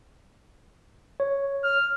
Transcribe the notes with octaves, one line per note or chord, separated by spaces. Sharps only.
C#5
F6